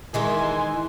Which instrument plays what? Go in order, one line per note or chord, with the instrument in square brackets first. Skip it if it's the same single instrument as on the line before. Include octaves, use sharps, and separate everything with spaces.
[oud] D#3 E3 G#3 [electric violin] G#5 C6